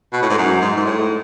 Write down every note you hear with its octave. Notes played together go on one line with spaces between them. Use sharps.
B2
A2
G#2
F#2
G#2
G#2
A2